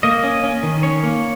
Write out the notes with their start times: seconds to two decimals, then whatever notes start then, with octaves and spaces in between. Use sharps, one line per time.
0.03 A#3 D#5
0.24 C#4
0.44 C#4
0.63 D#3
0.83 C#4 C#5
1.03 A#3